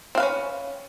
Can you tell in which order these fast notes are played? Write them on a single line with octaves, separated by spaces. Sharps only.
C4 F5 B4 C#4